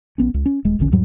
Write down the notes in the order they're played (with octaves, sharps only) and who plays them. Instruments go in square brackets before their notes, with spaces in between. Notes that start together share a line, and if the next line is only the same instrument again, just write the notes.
[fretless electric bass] A#1 B3 C#4
C#2
C#4
D#1 G#3
D#1 A#1 D3 C#4
E2 G#2 F#3 G3